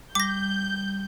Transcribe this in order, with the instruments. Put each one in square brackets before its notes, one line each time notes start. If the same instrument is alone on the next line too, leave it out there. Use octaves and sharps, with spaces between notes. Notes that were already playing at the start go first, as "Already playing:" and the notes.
[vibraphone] G3 [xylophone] D6 A#6 [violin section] G6